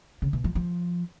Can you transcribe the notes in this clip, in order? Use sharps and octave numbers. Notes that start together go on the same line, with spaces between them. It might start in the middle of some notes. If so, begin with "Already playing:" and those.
C#3
B2
F3
F3